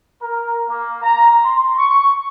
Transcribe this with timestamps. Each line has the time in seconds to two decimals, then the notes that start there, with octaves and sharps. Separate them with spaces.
0.21 A#4
0.69 A#3
1.02 A#5
1.44 C6
1.78 C#6